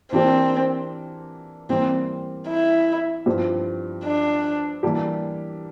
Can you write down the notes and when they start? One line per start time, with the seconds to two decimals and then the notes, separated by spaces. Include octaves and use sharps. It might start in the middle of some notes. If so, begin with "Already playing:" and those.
0.12 E3 A#3 C4 D4 G4 A#4
1.69 E3 G3 A#3 C4
2.48 E4
3.26 G2 F3 C4 G4
4.04 D4
4.83 E3 G3 A#3 D4 G4